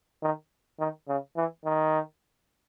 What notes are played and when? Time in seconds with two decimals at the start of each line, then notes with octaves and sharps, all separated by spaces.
0.23 D#3
0.79 D#3
1.08 C#3
1.37 E3
1.65 D#3